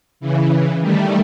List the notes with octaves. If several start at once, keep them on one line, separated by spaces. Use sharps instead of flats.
C#3 E3
D#3 G3 A3